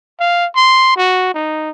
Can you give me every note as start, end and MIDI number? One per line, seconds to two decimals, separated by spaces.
0.20 0.47 77
0.56 0.95 84
0.97 1.32 66
1.34 1.70 63